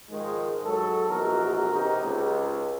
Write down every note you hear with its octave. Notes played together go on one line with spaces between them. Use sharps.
G#2 D#3 F3 G#3
G#2 F#3 A4
A#1 E2 G#2 F#4 A#4
C3 D#4
C#2